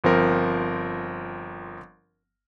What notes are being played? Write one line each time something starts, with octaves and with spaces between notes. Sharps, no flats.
G1 F3 C4 A#4